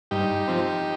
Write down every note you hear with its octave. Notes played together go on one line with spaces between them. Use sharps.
G2 D#4 G4
F3 C4